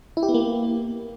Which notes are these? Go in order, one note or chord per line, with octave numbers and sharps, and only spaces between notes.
E4
G4
B3
A#3